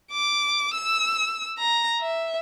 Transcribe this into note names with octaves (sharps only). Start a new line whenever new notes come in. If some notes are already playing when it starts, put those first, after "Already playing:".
D6
E6
A#5
E5